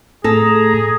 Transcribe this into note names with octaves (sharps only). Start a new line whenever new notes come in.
A2 G#4 A4 A#5